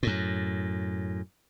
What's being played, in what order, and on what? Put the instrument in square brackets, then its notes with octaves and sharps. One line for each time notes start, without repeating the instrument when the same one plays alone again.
[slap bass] F#2 A2